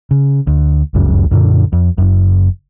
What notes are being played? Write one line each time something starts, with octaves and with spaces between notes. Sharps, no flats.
C#3
D2
F1 C#2 F#2 C#3
F#2 A#2 D3
F2
F#1 F#2